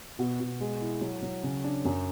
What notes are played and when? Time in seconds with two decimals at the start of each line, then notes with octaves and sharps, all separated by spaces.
0.19 B2
0.40 B2
0.60 G#3
0.81 E4
1.01 F#3
1.22 F#3
1.44 C#3
1.64 D4
1.85 F#2